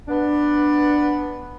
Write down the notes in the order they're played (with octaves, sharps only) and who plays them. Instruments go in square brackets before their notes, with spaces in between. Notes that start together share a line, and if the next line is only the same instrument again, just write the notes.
[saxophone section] B3 D4